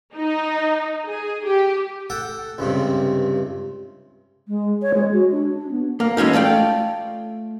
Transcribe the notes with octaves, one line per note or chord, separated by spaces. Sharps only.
D#4
G#4
G4
A4 F#5 G5
C#2 G2 C3
G#3
C#5
G#3
F#4
D4
D4
B3
A#3
E3 G#3 C#4 D#4
A3 F4 D5 G5